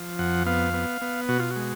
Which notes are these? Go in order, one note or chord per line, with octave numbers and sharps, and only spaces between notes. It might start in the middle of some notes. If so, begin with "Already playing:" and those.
Already playing: F3
F2 F#5
B3 F5
B3
B3
B2 F#4
F4
F#4
G#3